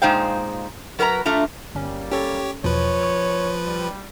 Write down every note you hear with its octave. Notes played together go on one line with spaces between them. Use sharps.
A#2 G#3 D#4 C5 F5 G5
F#3 A#4 B4 A5 A#5
A3 D4 F4 A#5
G1 G3 A#3 C#4
C#4 G4 A4 C#5 A6
E2 B2 F3 B4 C#5
C#6
G3